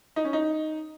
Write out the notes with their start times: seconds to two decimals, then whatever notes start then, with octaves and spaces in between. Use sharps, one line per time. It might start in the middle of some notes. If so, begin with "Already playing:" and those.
0.16 D#4
0.25 C#4
0.33 D#4